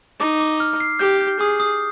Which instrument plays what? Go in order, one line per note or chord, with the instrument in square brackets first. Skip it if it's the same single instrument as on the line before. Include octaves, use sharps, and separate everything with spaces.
[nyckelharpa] D#4 [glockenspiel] D6
[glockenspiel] D6
F6
C7
[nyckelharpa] G4 [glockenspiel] G6
[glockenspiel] G6
[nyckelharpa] G#4 [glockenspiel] D#6
[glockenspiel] D#6